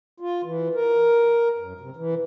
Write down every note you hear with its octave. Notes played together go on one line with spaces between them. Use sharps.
F4
E3
A#4
F#2
C3
E3